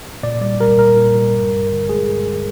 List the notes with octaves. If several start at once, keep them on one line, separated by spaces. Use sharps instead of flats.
A#2 D5
G3 D5
G3 A#4
A#2 A#4
A#2
G3
G2
G2
D3
G#3 G#4
G2